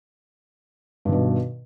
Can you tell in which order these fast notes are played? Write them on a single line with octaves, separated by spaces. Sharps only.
G2 D#3 B2